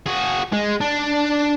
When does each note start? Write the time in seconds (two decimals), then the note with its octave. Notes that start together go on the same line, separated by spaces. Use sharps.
0.06 F#4 G#4
0.53 G#3
0.81 D4